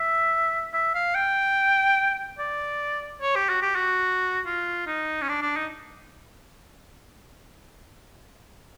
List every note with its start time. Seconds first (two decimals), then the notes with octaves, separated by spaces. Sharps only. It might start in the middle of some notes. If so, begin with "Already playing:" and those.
Already playing: E5
0.73 E5
0.95 F5
1.15 G5
2.39 D5
3.21 C#5
3.36 G4
3.49 F#4
3.62 G4
3.76 F#4
4.46 F4
4.87 D#4
5.22 C#4
5.29 D4
5.42 D4
5.56 D#4